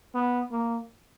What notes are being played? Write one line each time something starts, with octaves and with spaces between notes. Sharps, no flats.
B3
A#3